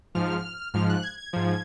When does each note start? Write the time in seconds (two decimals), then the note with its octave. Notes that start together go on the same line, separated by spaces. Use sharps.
0.15 G#2 F3 F6
0.74 G#2 F3 F6
0.89 F#6
1.03 G#6
1.18 G#6
1.33 G#2 F3